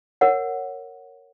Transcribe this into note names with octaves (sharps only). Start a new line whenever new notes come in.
A#4 C#5 F#5